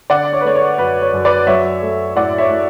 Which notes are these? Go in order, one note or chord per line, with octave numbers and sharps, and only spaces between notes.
D3 D5 F#5
C#5
B4
A3 C#5
C#5
F#2 B4
C#5
F#2
B4 D5
F#3 C#5 E5
A3
A2 D5 F#5
C#5 E5
A2